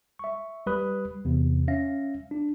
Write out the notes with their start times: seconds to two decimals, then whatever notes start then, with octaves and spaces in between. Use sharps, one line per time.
0.19 E5 C#6
0.66 G3 G4 B4 B5 D#6 F#6
1.25 E2 C3
1.68 C#4 E5 F5 A#6
2.31 D4